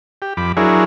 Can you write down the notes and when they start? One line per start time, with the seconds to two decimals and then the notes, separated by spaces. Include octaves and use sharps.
0.22 G4
0.37 F2 B5 D6
0.57 F#3 D4 E4 G#4 A#4 C#5